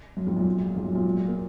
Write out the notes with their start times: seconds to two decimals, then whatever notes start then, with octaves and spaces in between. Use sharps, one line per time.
0.17 F#2
0.27 F2 G#2
0.36 F#2 A#2
0.75 F2 G#2
0.85 F#2
0.95 F#2 A#2
1.28 A#3